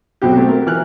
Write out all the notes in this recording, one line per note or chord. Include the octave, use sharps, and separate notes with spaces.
B1 F#3 C4 F#4 G4
A3 C4
A#4
E3 F6 F#6